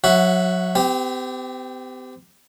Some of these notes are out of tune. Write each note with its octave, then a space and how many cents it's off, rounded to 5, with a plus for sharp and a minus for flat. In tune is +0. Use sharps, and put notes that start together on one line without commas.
F#3 -25 F#4 +0 E5 +0
C4 -45 G4 +0